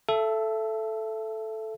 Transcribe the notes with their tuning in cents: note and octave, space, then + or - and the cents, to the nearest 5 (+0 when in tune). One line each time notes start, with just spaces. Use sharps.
A4 -5 E5 +25